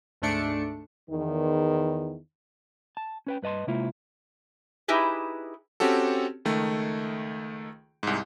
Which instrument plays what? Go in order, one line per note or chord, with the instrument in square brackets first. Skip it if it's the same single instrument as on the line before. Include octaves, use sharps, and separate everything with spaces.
[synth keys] D2 G#2 A3 D4 C#7 D7
[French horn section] E2 D#3
[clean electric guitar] A5
C#4 B4 G5
G2 B4 D#5 A5 C6
C3 G#3 A#3 E4 F4
[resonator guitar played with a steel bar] D#4 E4 G4 G#4 B4
[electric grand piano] C4 C#4 F#4 G4 A4
C#2 D#3 A3
C2 G#2